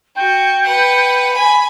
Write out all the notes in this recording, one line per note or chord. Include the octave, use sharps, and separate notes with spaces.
F#4 G5
B4 F#5
G#5 B5